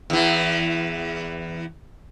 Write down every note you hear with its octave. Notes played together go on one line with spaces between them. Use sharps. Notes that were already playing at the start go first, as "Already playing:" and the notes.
E2 E3